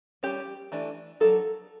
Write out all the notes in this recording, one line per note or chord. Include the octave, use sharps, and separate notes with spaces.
G3 C#4 G4
E3 A3 D4
F#3 A3 D4 A4